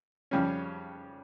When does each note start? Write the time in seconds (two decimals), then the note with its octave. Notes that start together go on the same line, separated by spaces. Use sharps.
0.31 F2 C#3 G3 C#4